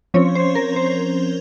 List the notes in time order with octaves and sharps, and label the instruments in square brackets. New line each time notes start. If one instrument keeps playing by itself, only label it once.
[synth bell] F3 C4 C#4 C#5
C5
A#4
C5